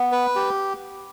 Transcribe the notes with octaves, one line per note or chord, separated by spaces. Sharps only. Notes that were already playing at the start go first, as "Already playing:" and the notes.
Already playing: B3
B4
G4